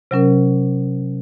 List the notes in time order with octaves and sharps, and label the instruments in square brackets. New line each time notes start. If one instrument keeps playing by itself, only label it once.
[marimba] C3 F#3 C#4 A#4